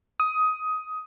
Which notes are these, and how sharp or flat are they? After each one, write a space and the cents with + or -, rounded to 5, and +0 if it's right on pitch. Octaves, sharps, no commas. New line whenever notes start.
D#6 +15